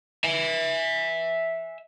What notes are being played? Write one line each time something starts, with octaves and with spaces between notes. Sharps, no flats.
E5 G#5